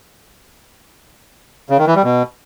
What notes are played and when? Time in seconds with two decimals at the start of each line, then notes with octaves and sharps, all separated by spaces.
1.70 C#3
1.78 D#3
1.87 E3
1.95 G3
2.04 B2